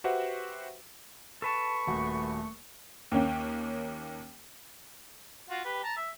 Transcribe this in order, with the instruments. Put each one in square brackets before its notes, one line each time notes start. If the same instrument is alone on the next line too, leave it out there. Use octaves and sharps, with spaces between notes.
[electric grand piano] F#4 G4 B4 C5 E5 F#5
[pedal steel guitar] A4 B4 A5 [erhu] C#6
[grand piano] D#1 F#4 [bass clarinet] A3
[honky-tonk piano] D#2 A#3 C#4 G5
[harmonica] F4 F#4
G4 B4
A5 A#5
E5